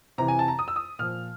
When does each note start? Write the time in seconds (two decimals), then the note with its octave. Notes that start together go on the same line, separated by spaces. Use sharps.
0.18 C3 E3 A#5
0.28 G#5
0.39 A5
0.48 A#5
0.59 D#6
0.68 E6
0.76 D#6
0.99 A#2 F3 F6